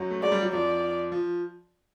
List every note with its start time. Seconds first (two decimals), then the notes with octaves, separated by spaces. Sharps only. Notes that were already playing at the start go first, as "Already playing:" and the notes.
Already playing: F#2 F#3
0.11 A3
0.21 G#3 D5
0.32 G3
0.42 F#3
0.52 F2 F3 D5
1.12 F3